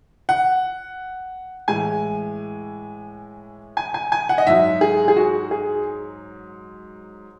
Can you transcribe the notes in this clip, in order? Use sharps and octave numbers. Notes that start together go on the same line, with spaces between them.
F#5
A2 E3 G#3 G#5
G#5
G#5
G#5
F#5
D#5
G#2 F#3 E5
G#4
G#4
F#4
G#4